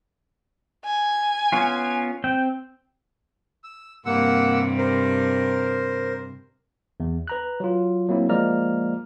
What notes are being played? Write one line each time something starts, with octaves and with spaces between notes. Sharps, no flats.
G#5
B3 C#4 F4
C4 G5
E6
G2 C3 A#3 F#5 E6
A#4 C5
E2
B4 A#5 F#6
F#3 F4
F#3 A#3 C4 E4
F3 G#3 A#3 D5 A#5 F6